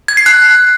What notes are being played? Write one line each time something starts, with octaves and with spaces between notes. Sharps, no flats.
G#6
C7
F#6